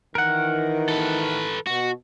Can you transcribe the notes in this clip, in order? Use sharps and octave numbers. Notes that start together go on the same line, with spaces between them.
D#3 E3 A#4 F#5
A4 B4
B2 F#4